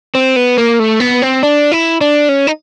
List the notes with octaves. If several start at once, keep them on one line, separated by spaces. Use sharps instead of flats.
C4
B3
A#3
A3
B3
C4
D4
E4
D4
C#4
D#4